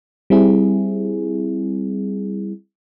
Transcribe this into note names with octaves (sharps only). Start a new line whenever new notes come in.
G3 C4 E4 G#4